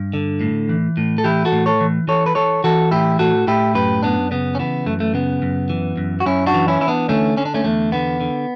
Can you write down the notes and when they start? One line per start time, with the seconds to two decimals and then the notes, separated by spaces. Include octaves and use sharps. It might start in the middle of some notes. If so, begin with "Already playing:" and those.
Already playing: G2
0.13 D3
0.41 A2
0.69 E3
0.97 A2
1.18 A4
1.24 E3 E4 G4
1.45 F#4 A4
1.52 A2
1.66 A4 C#5
1.81 E3
2.08 E3 A4 C#5
2.26 B4
2.35 E3 A4 C#5
2.64 E3 F#4 A4
2.91 A2 E4 G4
3.19 A2 F#4 A4
3.47 A2 E4 G4
3.75 F#2 G4 B4
4.03 F#2 B3 D4
4.31 C#3 B3
4.55 C#4
4.59 E3 B3
4.86 F#2 A3
5.00 A3
5.14 C#3 B3
5.42 F#2
5.70 E3
5.97 F#2
6.20 F#4
6.26 F#2 C#4 E4
6.47 D4 F#4
6.54 E3
6.68 C#4 E4
6.81 E3 E4
6.88 B3 D4
7.09 D3 A3 C#4
7.37 D3 C#4
7.45 D4
7.54 A3 C#4
7.64 E2 A3
7.92 D3 B3
8.21 D3